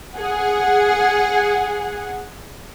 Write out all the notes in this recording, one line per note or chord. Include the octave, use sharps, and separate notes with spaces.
G#4 F#5